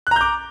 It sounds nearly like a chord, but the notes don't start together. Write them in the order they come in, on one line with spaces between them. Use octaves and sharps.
F#6 A#5 G6 D6